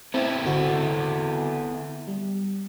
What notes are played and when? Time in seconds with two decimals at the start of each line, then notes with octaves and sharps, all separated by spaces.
0.14 B3 C4 E4 A4
0.44 G#1 D3 C4 F#4
2.08 G3